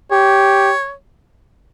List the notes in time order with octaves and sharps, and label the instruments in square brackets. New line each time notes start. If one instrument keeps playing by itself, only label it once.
[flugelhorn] G4 [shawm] C#5